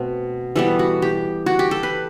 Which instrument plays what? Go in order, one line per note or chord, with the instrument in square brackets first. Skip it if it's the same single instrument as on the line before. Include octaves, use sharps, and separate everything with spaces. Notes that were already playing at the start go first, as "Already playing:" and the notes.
Already playing: [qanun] B2 A3 C4
E3 G3 B3 A4
F#4
G4
F#4
G4
A4
B4